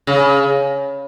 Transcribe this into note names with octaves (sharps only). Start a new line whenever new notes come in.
C#3